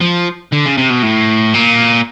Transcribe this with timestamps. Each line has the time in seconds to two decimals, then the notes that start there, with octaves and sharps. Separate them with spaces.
0.01 F3
0.52 D3
0.65 C#3
0.77 C3
0.90 B2
1.03 A2
1.54 A#2